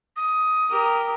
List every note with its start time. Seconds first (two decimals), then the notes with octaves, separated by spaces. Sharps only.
0.16 D#6
0.70 G4 A#4